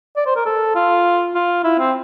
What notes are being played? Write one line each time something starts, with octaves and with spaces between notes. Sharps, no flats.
D5
C5
A#4
A4
F4
F4
E4
C4